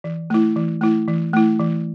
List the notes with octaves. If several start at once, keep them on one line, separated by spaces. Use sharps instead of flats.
E3
A3 E4
E3
A3 E4
E3
A3 E4
E3